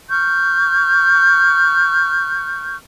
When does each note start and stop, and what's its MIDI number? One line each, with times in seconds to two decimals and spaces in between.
0.09 2.76 85
0.09 2.76 89
0.09 2.76 91